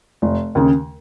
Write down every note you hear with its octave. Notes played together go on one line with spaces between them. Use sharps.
F1
D#2 C#3